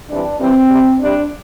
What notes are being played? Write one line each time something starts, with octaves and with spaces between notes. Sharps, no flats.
C3 E3 G3 D4
C3 E3 G3 C4
C3 G3
C3 G3 D4